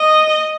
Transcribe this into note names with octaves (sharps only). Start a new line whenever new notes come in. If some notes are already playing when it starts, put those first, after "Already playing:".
Already playing: D#5